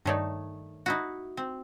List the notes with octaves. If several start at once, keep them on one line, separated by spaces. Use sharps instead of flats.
G2 D#3 A3 D#4 C#5 D5
D#4 E4 F#4
C4